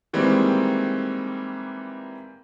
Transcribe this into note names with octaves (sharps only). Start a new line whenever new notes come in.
D#3 E3 G3 G#3 A#3 C4